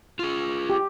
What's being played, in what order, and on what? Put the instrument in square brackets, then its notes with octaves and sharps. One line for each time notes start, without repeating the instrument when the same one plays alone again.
[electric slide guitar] F4 G#4
[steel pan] G4